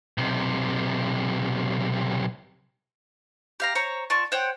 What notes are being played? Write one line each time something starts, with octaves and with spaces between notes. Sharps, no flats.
B1 C3
G4 F5 A#5
C5 C#5 A#5
F4 D5 A5 C#6
C5 C#5 F#5 G5